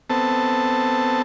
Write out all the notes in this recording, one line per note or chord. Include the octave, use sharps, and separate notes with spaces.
B3 C4 A4 A5